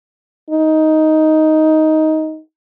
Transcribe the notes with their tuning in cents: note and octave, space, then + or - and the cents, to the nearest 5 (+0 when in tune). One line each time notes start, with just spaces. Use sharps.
D#4 +10